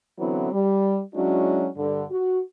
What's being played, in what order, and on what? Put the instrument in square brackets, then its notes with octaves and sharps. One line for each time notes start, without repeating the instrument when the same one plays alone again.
[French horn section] D3 E3 F#3 B3 C4 E4
G3
F#3 G#3 C#4 D4 E4 F#4
G2 D3
F#4